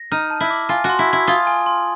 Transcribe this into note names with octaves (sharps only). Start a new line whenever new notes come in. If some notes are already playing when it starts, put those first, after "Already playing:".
Already playing: A#6
D#4 F6
A5
E4
D6
F4 G#5
F#4
C6
E4
G#6
E4
F4 D#6
G#5
C6